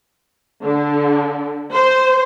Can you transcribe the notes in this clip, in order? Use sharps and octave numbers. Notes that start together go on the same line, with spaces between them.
D3
C5